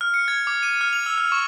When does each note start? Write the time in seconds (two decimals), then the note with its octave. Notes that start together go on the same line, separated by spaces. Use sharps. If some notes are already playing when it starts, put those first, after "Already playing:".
0.01 F6
0.14 C#7
0.28 G#6
0.47 D6
0.63 D#7
0.81 F6
0.93 F7
1.06 E6
1.18 F6
1.32 C#6